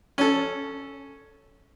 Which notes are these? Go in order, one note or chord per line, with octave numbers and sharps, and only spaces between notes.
C#4 A4